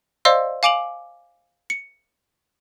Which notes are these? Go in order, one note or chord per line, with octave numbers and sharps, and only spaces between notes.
C5 D5 D#5 F5 C6 E6
F5 G#5 D6 D7 F7 F#7
C#7